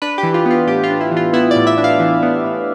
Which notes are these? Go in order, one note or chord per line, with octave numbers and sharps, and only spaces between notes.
D4 B4
G4
E3
F4
B3 F4
A2 G4
F4
D4
E4
E3
F4
B3 E4
D5
A2
E5
D4
F5
E3
B3
A2